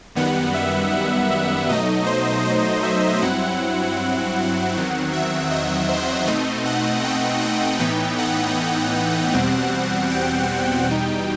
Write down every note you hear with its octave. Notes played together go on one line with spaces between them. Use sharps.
F#2 D#3 G3 B3 F#5
E5
F#5
E5
B2 F#3 A3 D#4 D#5
C5
C5
E5
G2 F#3 C4 E4 F#5
E2 D#3 F#3 C4 F#5
E5
D#5
C5
B2 A3 C4 D#4 D#5
F#5
G5
F#5
A2 E3 B3 D#4 G5
F#5
E2 B2 G3 C4
G5
G5
E2 B2 G3 D#4